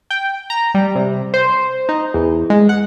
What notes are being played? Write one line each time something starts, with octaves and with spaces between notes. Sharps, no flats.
G5
A#5
G3
C3
C5
D#4
E2
G#3
F#5